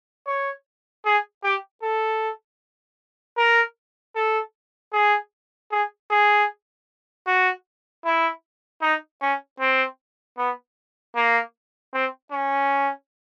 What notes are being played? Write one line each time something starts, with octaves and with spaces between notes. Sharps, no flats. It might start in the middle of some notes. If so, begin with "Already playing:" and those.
C#5
G#4
G4
A4
A#4
A4
G#4
G#4
G#4
F#4
E4
D#4
C#4
C4
B3
A#3
C4
C#4